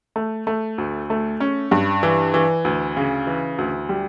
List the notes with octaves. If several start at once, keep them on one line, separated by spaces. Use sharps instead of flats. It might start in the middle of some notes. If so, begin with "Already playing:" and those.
A3
A3
D2
A3
C#4
G2
E3
E3
D2
C#3
E3
D2
G3